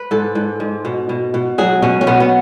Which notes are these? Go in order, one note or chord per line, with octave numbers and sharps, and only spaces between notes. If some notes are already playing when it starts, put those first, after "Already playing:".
Already playing: B4
G#2 A4
G#2
G#2
B2
B2
B2
F#3 G#4
B2 C#4
C#4
B2 B3
B3